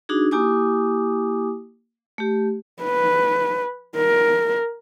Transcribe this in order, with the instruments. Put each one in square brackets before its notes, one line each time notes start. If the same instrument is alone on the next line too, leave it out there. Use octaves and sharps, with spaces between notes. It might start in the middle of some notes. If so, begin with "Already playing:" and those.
[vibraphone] D4 D#4 F#4 G#4
A#3 E4 G4 G#5 D6 D#6
A3 G4
[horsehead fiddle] B4
A#4